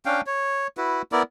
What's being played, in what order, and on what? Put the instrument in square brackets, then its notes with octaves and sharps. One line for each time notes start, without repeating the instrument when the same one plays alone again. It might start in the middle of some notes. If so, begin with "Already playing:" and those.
[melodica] C#4 D4 F5 G5
C#5
E4 F#4 B4
B3 E4 A#4 D5